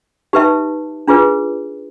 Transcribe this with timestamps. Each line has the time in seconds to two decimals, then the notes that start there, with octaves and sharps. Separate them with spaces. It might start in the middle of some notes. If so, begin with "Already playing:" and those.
0.33 D#4 G4 B4 E5 A5
1.08 D4 F4 G#4 B4